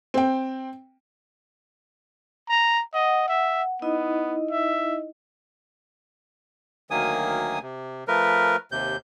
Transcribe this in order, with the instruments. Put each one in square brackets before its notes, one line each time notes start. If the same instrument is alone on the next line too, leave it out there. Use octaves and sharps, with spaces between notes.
[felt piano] C4 G5
[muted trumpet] A#5
[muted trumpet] D#5 [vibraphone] F#5
[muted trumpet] E5
[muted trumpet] B3 [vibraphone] D#4 E4 D#5
[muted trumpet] E5
[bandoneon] D2 D#3 F#3 A#3 G#5 D#6
C3
F3 A3 A#4 B4
D#2 C3 G6